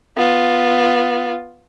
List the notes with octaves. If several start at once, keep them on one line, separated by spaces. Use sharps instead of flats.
B3 F4